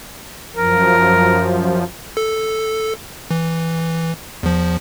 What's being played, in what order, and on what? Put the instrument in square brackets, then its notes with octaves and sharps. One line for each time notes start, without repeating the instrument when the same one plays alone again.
[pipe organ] F#2 F3 [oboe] A#4
[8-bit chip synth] A4
E3
E2 F3